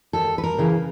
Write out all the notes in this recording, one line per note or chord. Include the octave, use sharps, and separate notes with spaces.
D#2 A4
B4
A#4
C#3 E3